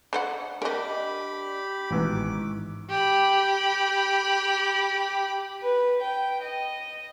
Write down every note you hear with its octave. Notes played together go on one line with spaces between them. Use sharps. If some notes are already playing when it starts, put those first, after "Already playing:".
D3 C5 F#5
D4 G4 A#4 D#5 B5
A1 G#2 B2 D#3 E3 D6
G4 B5
B4
G5
D#5